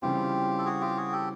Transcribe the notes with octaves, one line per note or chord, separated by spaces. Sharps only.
C#3 E3 G3 C4 F4 G4
A4
F#4 G#4
F4 G4
F#4 G#4
G4 A4